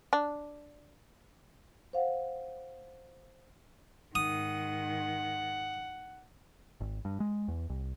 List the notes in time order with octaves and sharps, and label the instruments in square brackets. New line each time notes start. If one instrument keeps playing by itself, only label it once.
[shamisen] D4
[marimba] C5 F5 F#5
[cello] G#2 D#3 [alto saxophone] F#5 [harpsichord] D#6
[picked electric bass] G#1
G2
G#3
E2
C2